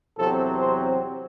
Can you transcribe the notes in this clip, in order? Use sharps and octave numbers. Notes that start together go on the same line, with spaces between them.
E2 C3 F#3 C4 A4
C5